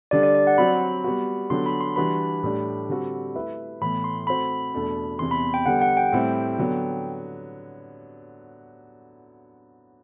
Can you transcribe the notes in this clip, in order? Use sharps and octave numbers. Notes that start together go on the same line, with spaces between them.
D3 G3 D4 D5
D5
D5
F#5
F#3 C4 F#4 B5
G3 B3 F#4
D3 F#3 B3 D4 G4 C6
B5
C6
E3 G3 D4 F#4 B4 B5
A2 G3 D4 G4 D5
D3 G3 C4 F#4 A4
A3 E4 B4 E5
A2 E3 B3 B5
C6
A3 C4 F#4 C5 B5
E2 B2 A3 D4 A4
E2 C3 E3 C6
B5
G5
D3 G3 B3 F#5
F#5
G5
A2 G3 C4 E4
D3 F#3 B3